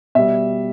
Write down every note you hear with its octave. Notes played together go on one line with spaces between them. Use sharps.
B2 G3 E5